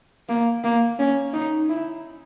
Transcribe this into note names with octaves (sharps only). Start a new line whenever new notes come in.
A#3
A#3
C#4
D#4
E4